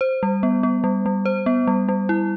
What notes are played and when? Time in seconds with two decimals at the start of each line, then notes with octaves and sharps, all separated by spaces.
0.01 C5
0.23 G3
0.43 B3
0.63 B3
0.84 G3
1.06 G3
1.26 C5
1.46 B3
1.67 G3
1.89 G3
2.09 E4